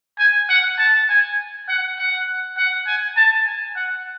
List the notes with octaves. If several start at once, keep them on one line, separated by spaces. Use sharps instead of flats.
G#5
F#5
A5
G#5
F#5
F#5
F#5
G#5
A5
G#5
F#5